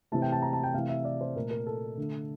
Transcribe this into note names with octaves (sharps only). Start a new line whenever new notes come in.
C3 E3 A3 A5
G5
A5
A#5
A5
G5
C3 E3 A3 F5
E5
D5
C5
A#2 A3 A#4
A#4
A4
D3 A3